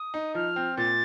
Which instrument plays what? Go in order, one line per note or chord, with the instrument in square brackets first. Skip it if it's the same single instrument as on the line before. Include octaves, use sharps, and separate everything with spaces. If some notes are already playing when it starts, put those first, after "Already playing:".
Already playing: [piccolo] D#6
[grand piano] D#4
[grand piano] F3 [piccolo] F6
[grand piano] C4
[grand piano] A#2 [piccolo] A6